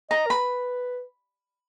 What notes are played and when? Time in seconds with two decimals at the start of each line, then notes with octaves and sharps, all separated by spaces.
0.11 D#5 A#5
0.26 A#4
0.30 B4 B5